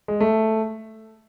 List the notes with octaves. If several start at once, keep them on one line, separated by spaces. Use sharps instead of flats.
G#3
A3